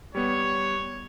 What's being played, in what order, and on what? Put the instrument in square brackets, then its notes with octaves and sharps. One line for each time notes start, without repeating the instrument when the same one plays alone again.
[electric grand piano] G3 B3 [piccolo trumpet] C#5